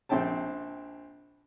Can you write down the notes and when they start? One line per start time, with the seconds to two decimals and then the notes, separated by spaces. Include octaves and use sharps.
0.09 A#1 C4 E5 G5 A5